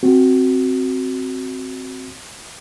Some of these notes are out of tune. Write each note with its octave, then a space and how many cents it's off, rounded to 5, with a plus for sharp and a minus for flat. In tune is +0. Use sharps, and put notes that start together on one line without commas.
C4 +5 F#4 +0